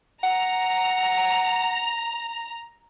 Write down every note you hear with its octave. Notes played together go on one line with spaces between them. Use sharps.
F#5 A#5